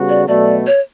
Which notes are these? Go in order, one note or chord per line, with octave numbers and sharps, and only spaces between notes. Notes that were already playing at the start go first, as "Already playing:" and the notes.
Already playing: C#3 G3 B3 F#4
D5
B2 F#3 A3 D5
C#5